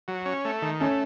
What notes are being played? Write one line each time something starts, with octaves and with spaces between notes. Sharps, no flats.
F#3
C#4
A3
D#3
A3 C#4